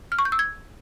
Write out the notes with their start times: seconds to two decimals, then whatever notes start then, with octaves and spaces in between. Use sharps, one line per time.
0.12 F6
0.19 C#6
0.25 G6
0.32 E6
0.39 G#6